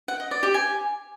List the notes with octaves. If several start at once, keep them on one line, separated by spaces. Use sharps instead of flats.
F#5
D#5
D5
G4
G#5